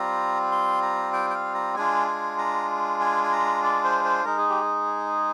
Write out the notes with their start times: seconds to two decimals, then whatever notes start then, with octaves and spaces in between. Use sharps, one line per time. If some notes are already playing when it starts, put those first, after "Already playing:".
Already playing: G3 C4 F4 A#5
0.52 C6
0.82 A#5
1.13 G5
1.30 G5
1.34 F5
1.55 A#5
1.76 G#3 D4 F4 G#5
2.08 G#5
2.38 A#5
3.01 G#5
3.23 G#5
3.32 A#5
3.63 D5
3.84 C5
4.05 C5
4.25 G#3 D#4 A#4
4.38 G#4
4.50 G4
4.61 G#4